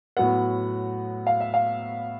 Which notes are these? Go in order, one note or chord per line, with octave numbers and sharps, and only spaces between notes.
A2 F#3 B3 F#5
F5
E5
F5